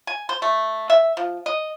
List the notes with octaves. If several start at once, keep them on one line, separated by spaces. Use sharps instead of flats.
G#5
C5
A3
E5
F3
D#5